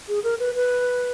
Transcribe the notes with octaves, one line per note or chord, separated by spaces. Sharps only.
G#4
A#4
B4
B4